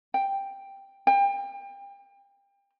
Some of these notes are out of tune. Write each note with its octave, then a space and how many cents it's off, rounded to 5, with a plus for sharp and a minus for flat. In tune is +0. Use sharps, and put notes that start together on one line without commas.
G5 +5
G5 +30